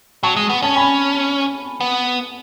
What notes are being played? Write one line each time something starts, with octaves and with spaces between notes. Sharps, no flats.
F#3 A5 C#6
G#3
B3
C#4 A5
G#5 B5
B3